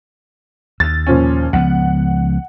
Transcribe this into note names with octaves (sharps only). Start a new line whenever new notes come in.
D#2 A6
A#2 F3 C#4
C#2 F3 B3 F#5